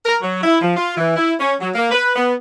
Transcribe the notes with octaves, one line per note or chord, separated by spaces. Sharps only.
A#4
F#3
E4
F3
F4
E3
E4
C#4
F#3
A#3
B4
B3